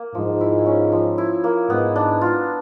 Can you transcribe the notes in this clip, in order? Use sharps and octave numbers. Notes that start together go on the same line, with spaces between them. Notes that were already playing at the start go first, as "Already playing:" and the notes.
Already playing: A#3
G#2 F3
E4
C#4
F3
E4
A#3
G#2 B3
D4
F4